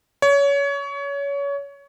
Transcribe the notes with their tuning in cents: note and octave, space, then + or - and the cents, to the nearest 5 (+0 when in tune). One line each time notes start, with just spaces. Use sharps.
C#5 +25